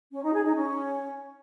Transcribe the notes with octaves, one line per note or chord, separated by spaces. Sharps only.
C#4
D#4
G#4
D#4
C#4